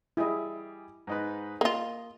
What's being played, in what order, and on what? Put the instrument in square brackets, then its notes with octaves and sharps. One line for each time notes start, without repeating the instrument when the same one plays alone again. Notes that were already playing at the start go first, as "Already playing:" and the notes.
[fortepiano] G3 G4 G#4 [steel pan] E4 D#5
[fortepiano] G#2 D#4 B4
[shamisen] A#3 F4 [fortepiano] D#5